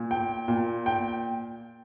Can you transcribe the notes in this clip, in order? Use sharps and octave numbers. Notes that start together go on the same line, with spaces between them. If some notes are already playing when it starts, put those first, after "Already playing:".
Already playing: A#2
G5
A#2
G5